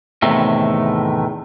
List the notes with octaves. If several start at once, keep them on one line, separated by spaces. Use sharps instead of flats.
E2 A2 C3 D#3 A3